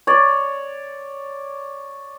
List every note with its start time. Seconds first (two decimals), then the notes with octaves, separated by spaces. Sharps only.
0.07 C#5 D5